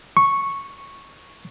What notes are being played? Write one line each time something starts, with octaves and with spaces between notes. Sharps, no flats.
C#6